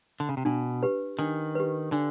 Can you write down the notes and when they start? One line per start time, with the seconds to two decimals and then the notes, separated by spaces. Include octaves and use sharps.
0.20 D3
0.29 C#3
0.37 C3
0.45 B2 D4
0.83 G4 B4
1.19 D#3 D4
1.55 G4 B4
1.92 D3 D4